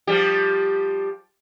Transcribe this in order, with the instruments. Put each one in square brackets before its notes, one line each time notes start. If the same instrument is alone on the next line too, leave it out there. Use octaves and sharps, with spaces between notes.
[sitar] F3 G3 G4